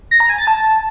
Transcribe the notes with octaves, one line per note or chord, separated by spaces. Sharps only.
A#6
A#5
G#5
A6
A5